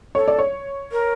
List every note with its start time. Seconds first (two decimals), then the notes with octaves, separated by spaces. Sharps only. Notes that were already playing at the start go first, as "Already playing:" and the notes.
0.15 A4 C#5
0.28 D5
0.39 C#5
0.92 A#4